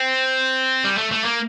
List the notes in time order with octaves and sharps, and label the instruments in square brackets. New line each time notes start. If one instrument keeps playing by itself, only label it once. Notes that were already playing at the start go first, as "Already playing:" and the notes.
Already playing: [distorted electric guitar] C4
G3
A3
A3
A#3